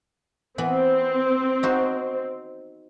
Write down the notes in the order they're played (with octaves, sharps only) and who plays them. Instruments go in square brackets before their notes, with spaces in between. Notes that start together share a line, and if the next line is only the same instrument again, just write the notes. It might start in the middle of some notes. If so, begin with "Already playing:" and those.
[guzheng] E3 B3 [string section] C4
[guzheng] D#4 F#4 C5